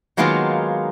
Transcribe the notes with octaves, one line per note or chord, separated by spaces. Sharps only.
D#3 F#3 G#3 A#3 B3 F4